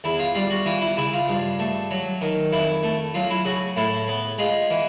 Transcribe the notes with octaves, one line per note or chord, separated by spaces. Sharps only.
E2 E4
F4
G3 F4
F#4
E3 F4
E4
C#3 E4
F4
G2
A3
F#3
D#3
F2 E4
A3
F#3 F4
E4
C#3 F#4
A2 E4
B3
G#3 F4
E3